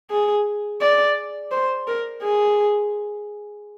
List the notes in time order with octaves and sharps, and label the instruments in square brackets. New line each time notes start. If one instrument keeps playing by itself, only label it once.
[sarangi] G#4
D5
C5
A#4
G#4